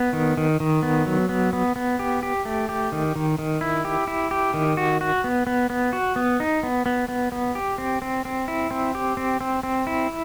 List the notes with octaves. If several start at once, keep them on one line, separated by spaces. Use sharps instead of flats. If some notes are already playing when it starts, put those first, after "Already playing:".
Already playing: B3
D#3
D#3
D#3
B3
F#3
B3
B3
B3
G4
G4
A3
G4
D#3
D#3
D#3
E4
G4
E4
G4
D#3
F#4
F#4
B3
B3
B3
F#4
B3
D#4
B3
B3
B3
B3
G4
C4
C4
C4
E4
C4
G4
C4
C4
C4
E4